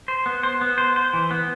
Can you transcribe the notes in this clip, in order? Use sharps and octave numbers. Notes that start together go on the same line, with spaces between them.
C5
B3
C5
B3
C5
C5
E3
B3